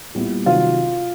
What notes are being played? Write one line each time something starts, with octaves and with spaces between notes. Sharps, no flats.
A#2 G3 B3 E4
C3 D#3 F#3 F4